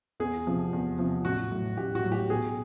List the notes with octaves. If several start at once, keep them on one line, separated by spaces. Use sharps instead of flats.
E2 G#4
C3 F3
E2
C3 F3
A1 F#4
A2 F#3
A1 G4
F#4
A2 F#3
G4
B1 G#4